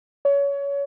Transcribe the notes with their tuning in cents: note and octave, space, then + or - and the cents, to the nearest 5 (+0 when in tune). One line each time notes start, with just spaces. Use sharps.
C#5 +25